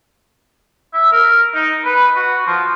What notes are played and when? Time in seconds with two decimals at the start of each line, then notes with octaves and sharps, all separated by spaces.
0.94 E5
1.12 A#4
1.54 D#4
1.85 B4
2.16 F#4
2.47 F3